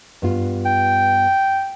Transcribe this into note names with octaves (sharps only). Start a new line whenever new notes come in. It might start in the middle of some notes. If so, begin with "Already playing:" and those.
G2 B3 F4
G5